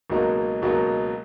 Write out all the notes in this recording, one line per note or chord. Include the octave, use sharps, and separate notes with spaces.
C#2 B2 F#3 A#3 D#4
C#2 B2 F#3 A#3 D#4